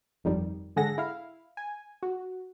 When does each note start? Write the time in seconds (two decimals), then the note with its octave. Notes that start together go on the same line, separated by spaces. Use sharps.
0.24 G1 F2 D#3 G3
0.76 G#2 D3 G#4 A4 F#5 A#6
0.98 E4 F5
1.57 G#5
2.03 F#4